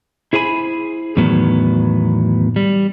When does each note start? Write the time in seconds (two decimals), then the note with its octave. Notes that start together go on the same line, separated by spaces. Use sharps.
0.33 E4 G#4 C5 G#5 B5
1.17 E2 A2 D#3 F#3 B3
2.56 G3